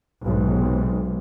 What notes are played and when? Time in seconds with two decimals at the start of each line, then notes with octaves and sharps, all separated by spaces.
0.22 B1 G#2 C3